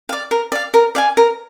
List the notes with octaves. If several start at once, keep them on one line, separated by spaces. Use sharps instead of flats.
D5 F5
A#4
D5 F5
A#4
D5 F5 G#5
A#4